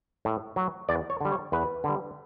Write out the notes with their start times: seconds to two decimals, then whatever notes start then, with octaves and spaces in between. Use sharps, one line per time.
0.25 A2
0.56 F#3
0.89 E2 D5
1.10 C#5
1.21 D3 G3
1.32 C#5
1.52 E2 B4
1.84 D3 G3